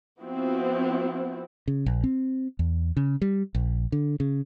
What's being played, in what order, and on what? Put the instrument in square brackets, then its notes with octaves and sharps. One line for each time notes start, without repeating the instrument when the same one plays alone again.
[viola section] F3 B3 C4 E4 F#4
[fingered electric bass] C#3
A#1
C4
E2
C#3
G3
A#1
D3
C#3